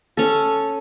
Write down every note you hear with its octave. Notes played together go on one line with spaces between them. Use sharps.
C#4 A4